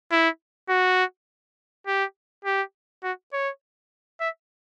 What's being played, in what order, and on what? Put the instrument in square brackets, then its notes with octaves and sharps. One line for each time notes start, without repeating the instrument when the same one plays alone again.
[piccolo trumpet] E4
F#4
G4
G4
F#4
C#5
E5